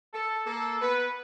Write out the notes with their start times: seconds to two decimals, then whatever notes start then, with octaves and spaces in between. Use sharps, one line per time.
0.13 A4
0.46 A#3 A4
0.81 B3 B4